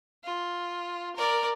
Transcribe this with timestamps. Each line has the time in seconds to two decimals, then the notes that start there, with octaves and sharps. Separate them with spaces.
0.24 F4
1.16 A#4 D5